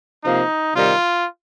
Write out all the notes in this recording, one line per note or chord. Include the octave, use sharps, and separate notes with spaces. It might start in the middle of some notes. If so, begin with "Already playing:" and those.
C3 F3 A#3 D#4
C3 D#3 G3 F4